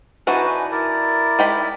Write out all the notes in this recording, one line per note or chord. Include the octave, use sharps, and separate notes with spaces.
E3 D4 D#4 F#4 B4 G#5
E4 A#4 D5
G#3 G5 B5